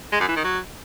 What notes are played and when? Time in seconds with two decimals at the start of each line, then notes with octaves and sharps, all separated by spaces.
0.12 G#3
0.20 F#2
0.28 E3
0.36 D#3
0.44 F#3